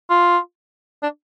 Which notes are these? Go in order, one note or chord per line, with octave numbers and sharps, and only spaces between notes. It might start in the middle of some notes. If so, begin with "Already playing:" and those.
F4
D4